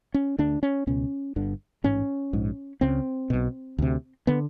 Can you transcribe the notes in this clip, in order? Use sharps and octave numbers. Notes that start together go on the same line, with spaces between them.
C#4
D2 D3 D4
C#4
C#2 B2 C#4
G1 G2 D3
A1 G#2 C#4
A#1 G#2
C#2 C#3 C4
B1 B2
D2 C3
D3 B3